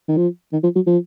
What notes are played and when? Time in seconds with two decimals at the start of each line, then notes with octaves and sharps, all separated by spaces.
0.08 D#3
0.17 F3
0.52 D#3
0.63 F3
0.75 F#3
0.87 F3